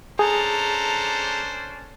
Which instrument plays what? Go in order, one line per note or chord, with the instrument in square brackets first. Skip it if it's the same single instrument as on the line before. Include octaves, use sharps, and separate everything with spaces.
[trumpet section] C#4 D4 C5 [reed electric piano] G#4 [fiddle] A4 A#5